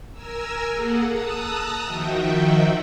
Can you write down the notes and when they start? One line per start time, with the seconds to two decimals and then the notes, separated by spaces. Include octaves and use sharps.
0.12 A#4 G#5 A#5 E6
0.68 A#3 G#4 A4 F#5
1.08 A5 A#5 D#6 E6 F#6 A#6
1.85 D#3 F3 D#4 F#4 E5 G5